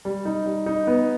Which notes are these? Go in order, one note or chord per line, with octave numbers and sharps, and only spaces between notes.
G3
D#4
G3
D#4
B3